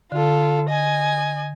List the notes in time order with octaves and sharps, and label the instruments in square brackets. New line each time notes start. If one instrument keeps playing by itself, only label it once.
[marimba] D3 [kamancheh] F4 A4
[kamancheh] D#5 G#5